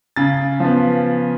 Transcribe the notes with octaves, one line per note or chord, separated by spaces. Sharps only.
C#3 A6
F3 B3